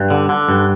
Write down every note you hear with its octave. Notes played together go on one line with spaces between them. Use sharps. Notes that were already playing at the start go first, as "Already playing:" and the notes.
Already playing: G2
D3
D3
G2